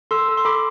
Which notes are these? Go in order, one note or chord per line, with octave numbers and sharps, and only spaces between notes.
A4 C6 E6
A4
C6
A4 B5 D6